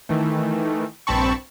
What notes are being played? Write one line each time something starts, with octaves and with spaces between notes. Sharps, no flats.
D#3 E3 A3
A#1 G2 C4 A5 B5 C#6